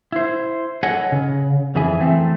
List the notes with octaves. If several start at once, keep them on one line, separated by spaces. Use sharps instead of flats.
E4 C5
A4 B4 C#5 D#5 F#5 G#5
C#3
F2 E3 G#4 E5 G#5
E3 A3 C4